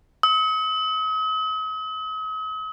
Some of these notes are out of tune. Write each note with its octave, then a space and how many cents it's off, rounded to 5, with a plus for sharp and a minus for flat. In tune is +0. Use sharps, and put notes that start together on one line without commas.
D#6 +45